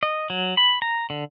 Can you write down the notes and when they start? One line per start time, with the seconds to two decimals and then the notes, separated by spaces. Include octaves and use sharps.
0.03 D#5
0.30 F#3
0.57 B5
0.82 A#5
1.10 D3